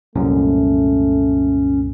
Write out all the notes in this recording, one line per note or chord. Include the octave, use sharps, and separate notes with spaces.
C2 F#2 A#2 A3 C#4